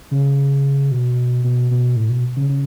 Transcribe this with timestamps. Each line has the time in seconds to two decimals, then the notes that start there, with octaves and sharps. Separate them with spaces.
0.11 C#3
0.91 B2
1.44 B2
1.71 B2
1.96 A2
2.10 B2
2.37 C#3
2.49 C#3